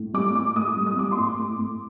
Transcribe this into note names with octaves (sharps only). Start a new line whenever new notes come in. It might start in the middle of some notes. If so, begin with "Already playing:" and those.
Already playing: A2
G3 D6
A2 D6
A2 D#6
G3
D#6
G3 D6
C6
A2
D6
A2
A2